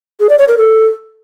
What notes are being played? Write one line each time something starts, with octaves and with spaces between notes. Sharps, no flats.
G#4
D5
C#5
A#4
A4